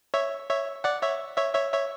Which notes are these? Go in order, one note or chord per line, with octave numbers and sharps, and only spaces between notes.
C#5 E5
C#5 E5
D5 F#5
C#5 E5
C#5 E5
C#5 E5
C#5 E5